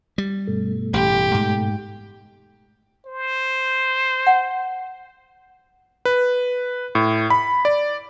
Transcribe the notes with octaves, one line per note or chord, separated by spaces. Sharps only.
G3
G2 B2 A3
A1 G4
G#2
C5
F#5
B4
A2
B5
D5